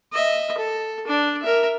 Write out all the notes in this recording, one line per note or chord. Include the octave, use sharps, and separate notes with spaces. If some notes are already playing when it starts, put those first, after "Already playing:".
D#5 E5
A4
D4
A#4 E5